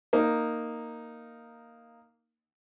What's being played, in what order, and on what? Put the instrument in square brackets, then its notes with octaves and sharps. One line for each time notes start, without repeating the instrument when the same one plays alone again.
[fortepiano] A#3 D#4